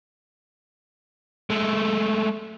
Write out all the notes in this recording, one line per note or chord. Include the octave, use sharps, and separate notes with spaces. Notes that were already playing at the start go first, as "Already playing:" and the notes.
G#3 A3